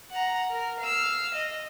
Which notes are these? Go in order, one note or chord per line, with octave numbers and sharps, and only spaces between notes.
F#5 A#5
A#4
F5 E6
D#5